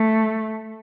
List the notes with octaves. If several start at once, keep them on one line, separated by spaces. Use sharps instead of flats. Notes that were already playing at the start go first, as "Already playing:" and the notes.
Already playing: A3